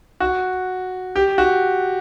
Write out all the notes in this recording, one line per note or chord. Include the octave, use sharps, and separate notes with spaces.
F#4
G4
F#4